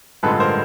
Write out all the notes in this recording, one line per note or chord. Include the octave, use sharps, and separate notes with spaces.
A1 G2 D3 F3 G#3 A4 B4
A#4 C5